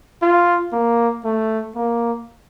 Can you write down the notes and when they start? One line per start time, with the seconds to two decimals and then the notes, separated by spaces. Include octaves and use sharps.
0.22 F4
0.73 A#3
1.25 A3
1.76 A#3